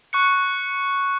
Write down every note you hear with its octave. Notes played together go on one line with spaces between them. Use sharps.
C#6 F#6 C#7